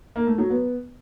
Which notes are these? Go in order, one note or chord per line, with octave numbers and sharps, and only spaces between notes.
A#3
A3
F#3
B3